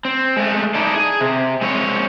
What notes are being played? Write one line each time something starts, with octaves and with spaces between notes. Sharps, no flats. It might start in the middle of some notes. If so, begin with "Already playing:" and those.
C4
G#3 A3
D#4 E4 A4 D5
G#4
C3
G#3 C4 C#5